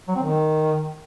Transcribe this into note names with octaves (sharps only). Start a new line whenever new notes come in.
F#3
C4
D#3